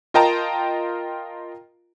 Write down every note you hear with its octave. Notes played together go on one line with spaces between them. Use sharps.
F4 A#4 D#5 G5 A5 A#5